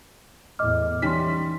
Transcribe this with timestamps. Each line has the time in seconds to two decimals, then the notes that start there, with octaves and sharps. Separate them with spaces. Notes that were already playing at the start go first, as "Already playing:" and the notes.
0.59 E2 A2 D#5 D6 F6
1.02 E3 G3 C#4 D#4 C6 B6